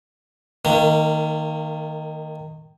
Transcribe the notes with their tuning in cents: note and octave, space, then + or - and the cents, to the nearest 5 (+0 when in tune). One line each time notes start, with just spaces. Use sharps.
D#3 +0 A#3 -30